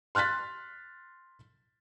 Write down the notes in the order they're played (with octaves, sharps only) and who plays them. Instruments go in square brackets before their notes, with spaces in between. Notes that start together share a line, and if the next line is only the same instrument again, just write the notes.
[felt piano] C6 F6 F#6 A6 B6